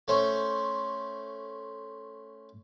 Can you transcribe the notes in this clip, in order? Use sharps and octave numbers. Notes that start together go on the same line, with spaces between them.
A3 C#4 C5